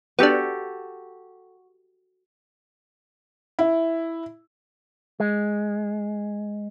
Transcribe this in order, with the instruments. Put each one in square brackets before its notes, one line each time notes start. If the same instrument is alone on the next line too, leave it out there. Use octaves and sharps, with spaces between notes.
[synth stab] B3 D4 [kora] F#4 G4 A4
[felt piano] E4
[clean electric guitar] G#3